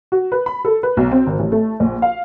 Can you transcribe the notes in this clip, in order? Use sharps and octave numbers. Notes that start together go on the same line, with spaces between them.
F#4
B4
B5
A4
B4
B1
C4
G#1
A1
A3
A#1
F5